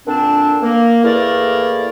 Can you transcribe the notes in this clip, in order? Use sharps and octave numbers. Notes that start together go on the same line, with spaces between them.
A#2 D3 C4 D4
A#3
E2 A3 A#3 E4 A#4 D5